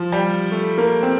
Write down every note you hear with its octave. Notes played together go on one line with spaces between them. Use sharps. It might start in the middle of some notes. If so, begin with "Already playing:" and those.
Already playing: F3
G3
A3
A#3
C4